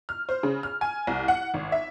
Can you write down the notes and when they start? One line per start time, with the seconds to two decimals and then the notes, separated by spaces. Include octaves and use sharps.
0.09 F6
0.29 C5
0.43 C#3
0.63 F6
0.81 G#5
1.07 C2
1.28 F#5
1.54 G#1
1.72 E5